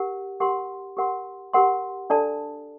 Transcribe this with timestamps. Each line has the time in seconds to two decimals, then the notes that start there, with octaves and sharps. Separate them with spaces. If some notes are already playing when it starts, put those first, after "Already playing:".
Already playing: G4 A#4 F#5
0.40 G4 A#4 F#5 C6
0.97 G4 A#4 F#5 C6
1.53 G4 A#4 F#5 C6
2.10 D4 A4 D5 A5